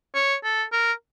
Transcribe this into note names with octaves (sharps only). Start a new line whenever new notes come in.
C#5
A4
A#4